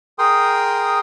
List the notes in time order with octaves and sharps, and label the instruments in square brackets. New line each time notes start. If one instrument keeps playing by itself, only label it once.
[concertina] G#4 A#4 G5 C6 D#6